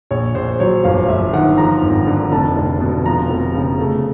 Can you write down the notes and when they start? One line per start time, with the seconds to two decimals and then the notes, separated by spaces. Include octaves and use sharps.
0.11 A#1 C#5
0.35 A#1 C5
0.49 C5
0.60 F#3 C#5
0.84 G1 F5
1.09 G1 E5
1.33 D#3 F#5
1.58 F3 A#5
1.82 G#1
2.07 D3
2.32 F1 A5
2.56 F1
2.80 B2
3.05 F3 A#5
3.30 F1
3.54 C#3
3.79 A3